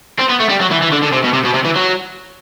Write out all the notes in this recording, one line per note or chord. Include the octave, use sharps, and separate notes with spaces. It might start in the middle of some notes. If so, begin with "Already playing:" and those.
C4
B3
A3
G3
F#3
E3
E3
D3
D3
C3
B2
C3
B2
C3
E3
F#3